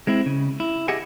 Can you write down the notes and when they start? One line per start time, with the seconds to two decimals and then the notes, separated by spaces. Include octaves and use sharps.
0.07 G#3 C4 E4
0.26 C#3
0.60 E4
0.88 G4 G#4 D#5 E5 F#5 G#5